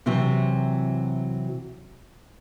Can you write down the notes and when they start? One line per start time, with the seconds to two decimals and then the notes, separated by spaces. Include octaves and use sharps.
0.06 C3 E3 F#3 C4